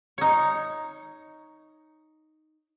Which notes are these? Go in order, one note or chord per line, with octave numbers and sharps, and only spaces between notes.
D#4 C#5